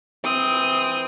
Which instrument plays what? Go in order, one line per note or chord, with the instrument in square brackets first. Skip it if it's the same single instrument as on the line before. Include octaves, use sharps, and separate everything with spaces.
[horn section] E3 C4 [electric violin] D#6